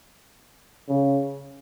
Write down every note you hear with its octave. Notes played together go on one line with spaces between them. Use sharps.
C#3